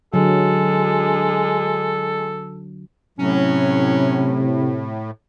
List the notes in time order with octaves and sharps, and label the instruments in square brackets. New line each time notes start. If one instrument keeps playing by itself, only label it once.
[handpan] D3 F#3 [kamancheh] G#3 [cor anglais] A4
[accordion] A2 [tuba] C3 [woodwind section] F#3 C#4